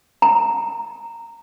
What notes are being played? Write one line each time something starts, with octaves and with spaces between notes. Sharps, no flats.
A#5